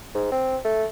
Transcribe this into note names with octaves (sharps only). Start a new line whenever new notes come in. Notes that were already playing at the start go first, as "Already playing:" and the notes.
G#2
C4
A3